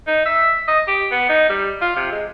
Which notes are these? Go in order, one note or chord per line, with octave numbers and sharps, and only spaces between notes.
D#4
E5
D#5
G4
B3
D#4
G3
F4
C3
G#3